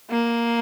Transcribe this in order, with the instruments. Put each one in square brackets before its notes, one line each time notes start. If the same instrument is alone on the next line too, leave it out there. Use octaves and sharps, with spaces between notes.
[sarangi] A#3